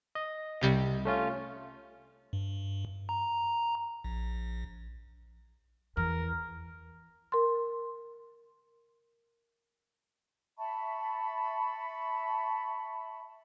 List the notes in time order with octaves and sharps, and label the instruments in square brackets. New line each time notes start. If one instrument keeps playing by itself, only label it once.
[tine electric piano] D#5
[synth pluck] C2 C3 G3
[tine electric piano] A3 C#4 F4
[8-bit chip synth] G2
A#5
A#1
[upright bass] E2 [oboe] A#4
[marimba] A#4 C6
[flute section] E5 A5 B5 C#6